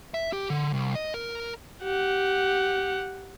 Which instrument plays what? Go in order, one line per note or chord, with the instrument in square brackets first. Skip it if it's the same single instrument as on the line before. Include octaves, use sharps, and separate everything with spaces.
[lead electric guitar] E5
G4
D3
C2
D#5
A#4
[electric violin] G4 F#5